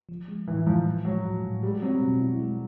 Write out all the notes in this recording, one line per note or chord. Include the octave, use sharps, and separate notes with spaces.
F3
G#3
A2 E3
A2 F3
F3
F#3 G#3
A2
A2
G3 G#3
F#3 C4
B2
E4
G#3